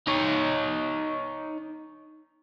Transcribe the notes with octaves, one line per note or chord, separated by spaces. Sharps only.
D#4 C#5